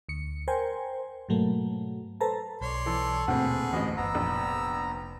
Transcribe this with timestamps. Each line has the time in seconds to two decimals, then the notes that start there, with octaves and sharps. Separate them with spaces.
0.09 D2 C#7
0.48 A#4 C5 G5 G#5
1.29 G#2 B2 F#3 A3 A#3
2.21 A4 B4 C5 A5 A#5
2.61 B1 C#5 D5 C6
2.86 E3 A4
3.28 D#1 D2 B2 A#3 C4 G#4 B4
3.73 A1 D2 E3 B3 D#5
3.97 F#1 B3 A#5 E6
4.15 F1 A#1